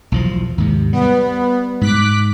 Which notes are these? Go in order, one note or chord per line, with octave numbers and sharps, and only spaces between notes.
B1 E2 F3
D#2 G#2 C3
G3 B3
G#2 D6 F#6 B6